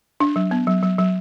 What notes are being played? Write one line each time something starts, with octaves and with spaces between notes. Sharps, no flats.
D4
F#3
B3
F#3
F#3
F#3